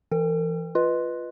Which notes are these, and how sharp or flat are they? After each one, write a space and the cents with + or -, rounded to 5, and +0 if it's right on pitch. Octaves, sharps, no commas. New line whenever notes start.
E3 +20 A#4 -45 G5 +30
F4 +0 B4 +0 D#5 +0